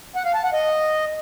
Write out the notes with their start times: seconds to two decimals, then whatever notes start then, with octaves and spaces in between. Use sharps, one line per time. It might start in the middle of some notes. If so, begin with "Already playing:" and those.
0.16 F#5
0.25 F5
0.34 A5
0.44 F#5
0.53 D#5